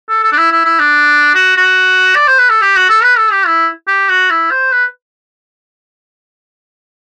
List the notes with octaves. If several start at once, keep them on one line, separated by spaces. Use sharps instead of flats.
A4
A4
D4
E4
E4
E4
D4
F#4
F#4
D5
C5
B4
A4
G4
F#4
A4
B4
A4
G4
E4
G4
F#4
E4
C5
B4